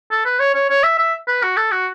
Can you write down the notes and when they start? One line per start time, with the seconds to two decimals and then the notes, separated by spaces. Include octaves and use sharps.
0.11 A4
0.25 B4
0.39 C#5
0.54 C#5
0.70 C#5
0.84 E5
0.99 E5
1.28 B4
1.43 F#4
1.57 A4
1.72 F#4